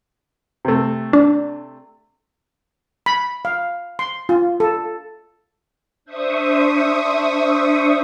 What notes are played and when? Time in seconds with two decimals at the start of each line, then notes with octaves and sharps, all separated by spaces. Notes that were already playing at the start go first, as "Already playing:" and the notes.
0.65 C3 A3
1.13 D4
3.06 B5
3.45 F5
3.99 C6
4.29 F4
4.60 A4
6.05 D4 C5 E5 C#6 D#6